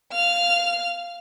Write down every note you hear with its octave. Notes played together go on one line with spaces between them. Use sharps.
F5 F6